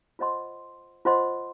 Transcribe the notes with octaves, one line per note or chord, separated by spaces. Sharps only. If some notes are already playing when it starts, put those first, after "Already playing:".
F4 C5 D#5 F#5 C6
F4 C5 D#5 F#5 C6